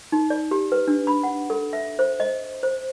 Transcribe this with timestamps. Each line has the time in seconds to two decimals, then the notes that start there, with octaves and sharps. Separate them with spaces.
0.12 D#4
0.30 D5
0.51 G4
0.72 B4
0.88 D4
1.07 B5
1.23 F#5
1.50 A4
1.73 E5
1.99 C5
2.20 D#5
2.63 C5